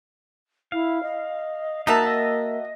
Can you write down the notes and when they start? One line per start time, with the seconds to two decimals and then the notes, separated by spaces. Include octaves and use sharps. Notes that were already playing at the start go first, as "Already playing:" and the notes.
0.72 E4 F5
1.03 D#5
1.87 A#3 D#4 F#4 E5 A5 A#5
2.07 D#5